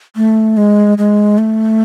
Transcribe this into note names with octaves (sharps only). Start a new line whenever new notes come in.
A3
G#3
G#3
A3